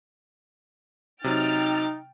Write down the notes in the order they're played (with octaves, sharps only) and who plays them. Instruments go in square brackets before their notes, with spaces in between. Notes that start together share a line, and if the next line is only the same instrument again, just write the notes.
[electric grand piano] C3 F#3 [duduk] D#4 [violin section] G5 F6 A6